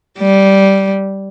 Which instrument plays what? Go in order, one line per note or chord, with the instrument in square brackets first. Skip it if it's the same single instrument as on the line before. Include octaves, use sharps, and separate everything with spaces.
[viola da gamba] G3